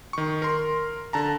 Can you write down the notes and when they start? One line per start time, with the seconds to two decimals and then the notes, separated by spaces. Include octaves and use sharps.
0.13 D#3 C#6
0.42 A#4 C6
1.13 D3 A5 A#5